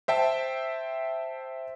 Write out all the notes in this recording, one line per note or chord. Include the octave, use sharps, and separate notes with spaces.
C5 E5 G5 A5